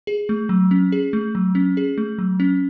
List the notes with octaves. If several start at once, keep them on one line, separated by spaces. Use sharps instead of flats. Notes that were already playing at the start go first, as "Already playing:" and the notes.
G#4
A3
F#3
C#4
G#4
A3
F#3
C#4
G#4
A3
F#3
C#4